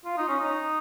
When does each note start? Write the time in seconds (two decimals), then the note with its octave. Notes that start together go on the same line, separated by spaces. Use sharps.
0.05 F4
0.17 D#4
0.28 C#4
0.40 D#4